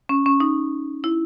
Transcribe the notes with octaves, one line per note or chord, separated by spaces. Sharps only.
C#4
C#4
D#4
E4